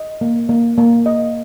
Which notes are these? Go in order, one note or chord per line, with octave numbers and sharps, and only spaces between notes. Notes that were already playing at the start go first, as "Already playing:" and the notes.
Already playing: D#5
A#3
A#3
A#3
D#5